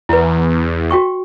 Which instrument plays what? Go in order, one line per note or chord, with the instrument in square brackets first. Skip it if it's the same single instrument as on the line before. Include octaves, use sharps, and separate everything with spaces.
[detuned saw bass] E2 [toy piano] E4 B4
[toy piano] F#4 G5 C#6